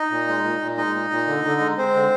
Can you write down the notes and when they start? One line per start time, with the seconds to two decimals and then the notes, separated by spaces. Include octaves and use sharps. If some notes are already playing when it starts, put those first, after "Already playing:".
Already playing: D#4 D#5
0.11 A#2
0.28 G#3
0.44 A#2
0.61 A#2
0.77 G#3 D#4 D#5
0.94 A#2
1.11 A#2
1.27 D3
1.45 D3
1.61 G#3
1.77 G#3 C4 C5
1.94 D3